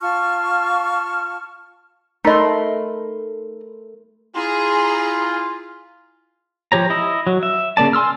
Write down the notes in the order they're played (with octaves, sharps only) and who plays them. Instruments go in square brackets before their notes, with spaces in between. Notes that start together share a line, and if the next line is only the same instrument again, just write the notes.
[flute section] F4 A5 C#6 F6
[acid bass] A3 [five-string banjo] D#4 D#5 [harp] A#4 B5 C6
[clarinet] E4 [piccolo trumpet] F4 [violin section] G#4 A#5 [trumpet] C6
[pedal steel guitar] F3 G4 C#5 A#5
E4 D#5
F#3
E5
C#3 A#3 D5 A5
G#5 C6 E6 F6